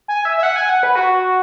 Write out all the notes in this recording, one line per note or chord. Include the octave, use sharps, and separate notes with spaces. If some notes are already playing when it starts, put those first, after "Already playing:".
G#5
E5
E5
F#5
G#5
F#5
B4
F#4